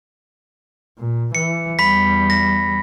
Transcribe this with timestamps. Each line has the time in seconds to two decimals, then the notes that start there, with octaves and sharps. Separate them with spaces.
0.98 A#2
1.35 E3 C#7
1.79 E2 G3 B5 B6
2.30 A#6